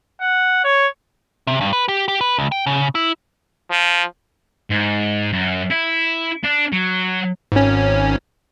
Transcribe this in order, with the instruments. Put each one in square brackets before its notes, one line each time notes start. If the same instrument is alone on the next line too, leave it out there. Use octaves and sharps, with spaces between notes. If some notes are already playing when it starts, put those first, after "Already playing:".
[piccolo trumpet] F#5
C#5
[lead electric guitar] C3
G2
B4
G4
G4
B4
C#2
G5
C#3
E4
[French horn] F3
[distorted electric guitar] G#2
F#2
E4
D4
F#3
[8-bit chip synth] G#1 C#4